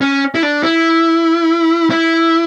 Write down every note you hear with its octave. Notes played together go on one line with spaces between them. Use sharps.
C#4
E4
D4
E4
E4